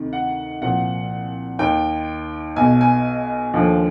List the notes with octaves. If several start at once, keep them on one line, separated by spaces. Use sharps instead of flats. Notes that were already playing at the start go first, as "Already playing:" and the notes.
Already playing: D2 C3 D#3
F#5
C2 A#2 F3 F#5
D#2 D#3 G5
B1 B2 G#5
G#5
D#2 D3 F3